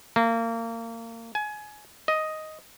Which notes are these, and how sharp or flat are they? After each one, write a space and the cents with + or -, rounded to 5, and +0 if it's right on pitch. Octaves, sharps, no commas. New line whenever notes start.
A#3 -30
G#5 +25
D#5 +5